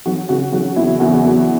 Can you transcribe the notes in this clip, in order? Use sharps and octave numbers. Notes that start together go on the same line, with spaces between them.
F#3 F#4
C#3 F#4
F#3 F#4
E2 E4
E2 F#4
E2